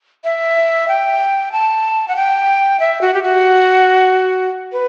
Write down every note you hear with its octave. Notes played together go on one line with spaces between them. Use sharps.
E5
G5
A5
F#5
G5
E5
F#4
G4
F#4
B4